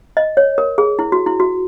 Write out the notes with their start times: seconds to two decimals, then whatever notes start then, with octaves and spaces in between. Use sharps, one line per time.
0.17 D#5
0.37 C#5
0.58 A#4
0.78 G#4
0.99 E4
1.12 F#4
1.26 E4
1.40 F#4